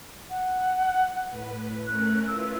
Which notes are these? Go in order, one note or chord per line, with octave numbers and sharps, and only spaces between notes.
F#5
A2 B4
A3 C#4 A#4 F#6
E4 F4 B4 E6